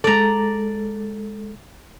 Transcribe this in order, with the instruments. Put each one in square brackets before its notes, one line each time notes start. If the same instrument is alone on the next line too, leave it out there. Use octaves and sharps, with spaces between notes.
[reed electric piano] G#3 A4 [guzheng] D5 A#5